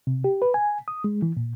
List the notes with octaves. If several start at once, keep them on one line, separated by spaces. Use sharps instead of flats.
C3
G4
B4
G#5
D#6
G#3
E3
A#2